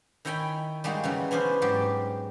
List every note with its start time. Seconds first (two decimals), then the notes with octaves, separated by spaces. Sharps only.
0.25 D#3 E4 C#5 G5 G#5 B5
0.84 G3 G#3 A#3 D#4 F#4
1.04 C#3 E3 F#3
1.31 E3 B3 C#4 D4 C5
1.62 G#2 F#3 G4 D5